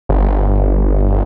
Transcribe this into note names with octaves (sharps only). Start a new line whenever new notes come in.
G1